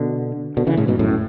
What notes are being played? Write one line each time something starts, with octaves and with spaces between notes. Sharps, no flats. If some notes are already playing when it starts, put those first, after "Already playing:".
Already playing: B2 D3
B2 D3
C#3 E3
A2 C#3
G#2 B2
F#2 A2